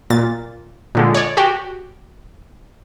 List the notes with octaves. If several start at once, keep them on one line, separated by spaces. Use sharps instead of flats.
A#2 A6
A#2 D3 G#3
C#5 D5
F#4 G4 G5